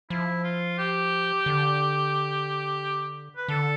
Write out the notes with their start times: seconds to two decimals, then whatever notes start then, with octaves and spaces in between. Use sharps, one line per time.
0.10 F3 E4
0.44 F4
0.78 G4
1.46 D3
3.37 B4
3.48 D3 A4